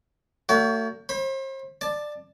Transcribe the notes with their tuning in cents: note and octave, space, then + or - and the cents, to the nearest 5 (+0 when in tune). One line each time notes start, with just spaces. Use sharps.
A3 +40 F#4 +20 D5 -45
C5 +40 B5 +0
D5 +15 A5 +0